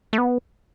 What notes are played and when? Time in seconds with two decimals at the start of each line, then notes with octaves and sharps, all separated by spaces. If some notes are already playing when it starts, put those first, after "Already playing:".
0.13 A3
0.18 B3